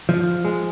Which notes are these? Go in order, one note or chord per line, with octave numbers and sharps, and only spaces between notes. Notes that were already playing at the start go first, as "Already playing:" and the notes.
F3
G#3